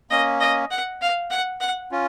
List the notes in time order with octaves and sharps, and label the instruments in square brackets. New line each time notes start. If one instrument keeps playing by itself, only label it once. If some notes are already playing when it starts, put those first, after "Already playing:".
[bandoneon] A#3 C#4 [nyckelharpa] D#5
[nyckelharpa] D#5
F#5
F5
F#5
F#5
[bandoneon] C#4 F4